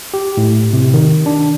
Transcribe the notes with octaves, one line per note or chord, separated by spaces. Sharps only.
G4
A2
C3
D#3
D4